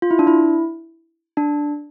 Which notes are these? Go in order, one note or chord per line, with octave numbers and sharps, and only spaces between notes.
F4
E4
D4
E4
D4